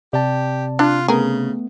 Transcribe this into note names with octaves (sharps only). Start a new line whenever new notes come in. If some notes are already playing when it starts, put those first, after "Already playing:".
C3 G4 D5 A5
D4 F4 F#6
C#3 A3 B3 G#4 A#4